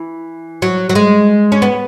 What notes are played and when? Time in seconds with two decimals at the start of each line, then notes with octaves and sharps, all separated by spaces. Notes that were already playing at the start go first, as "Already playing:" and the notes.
Already playing: E3
0.62 F#3
0.90 F#3
0.95 G#3
1.52 C#4
1.62 B3